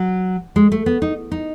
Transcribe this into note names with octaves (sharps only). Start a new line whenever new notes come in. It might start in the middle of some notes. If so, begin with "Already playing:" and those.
Already playing: F#3
G#3
A3
B3
D#4
D#4